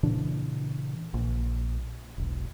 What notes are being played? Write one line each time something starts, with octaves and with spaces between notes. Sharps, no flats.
A#2 C#3 E3 D4
A#1
E1 B1